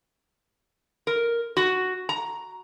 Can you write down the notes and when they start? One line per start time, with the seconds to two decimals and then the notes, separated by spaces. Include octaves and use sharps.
1.07 A#4
1.57 F#4
2.09 A#5